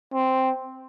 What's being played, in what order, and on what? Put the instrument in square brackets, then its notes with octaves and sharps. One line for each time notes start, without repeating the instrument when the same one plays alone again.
[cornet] C4